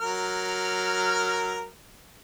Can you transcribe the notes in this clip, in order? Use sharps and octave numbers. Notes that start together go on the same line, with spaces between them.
F#3 A#4 F6